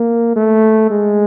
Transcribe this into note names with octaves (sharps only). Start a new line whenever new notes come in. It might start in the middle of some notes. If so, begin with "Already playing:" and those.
Already playing: A#3
A3
G#3